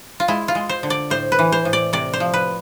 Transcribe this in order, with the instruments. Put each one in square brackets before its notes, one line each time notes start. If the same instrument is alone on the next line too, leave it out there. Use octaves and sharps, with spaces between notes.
[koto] F4
G#3 E4
F4
G#3
C5
D3
D5
A2 C5
B4
E3
C5
A2
D5
C3 D5
C5
F3
B4